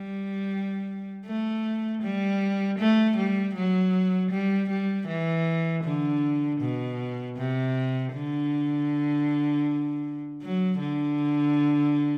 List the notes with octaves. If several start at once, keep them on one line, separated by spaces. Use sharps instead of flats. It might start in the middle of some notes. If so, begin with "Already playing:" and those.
Already playing: G3
A3
G3
A3
G3
F#3
G3
G3
E3
D3
B2
C3
D3
F#3
D3